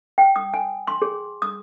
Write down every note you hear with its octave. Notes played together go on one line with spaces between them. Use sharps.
G5
D#6
G#5
C6
G#4
D#6